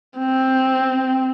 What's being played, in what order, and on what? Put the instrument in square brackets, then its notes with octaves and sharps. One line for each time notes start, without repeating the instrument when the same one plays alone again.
[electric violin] C4